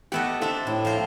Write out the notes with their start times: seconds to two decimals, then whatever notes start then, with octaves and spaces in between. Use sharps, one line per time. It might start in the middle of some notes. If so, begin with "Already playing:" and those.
0.12 A3 B3 G4 D#5 E5 F#5
0.41 C4 D4 A4 C5 E5
0.67 A2 E4
0.85 F3 A#4 C5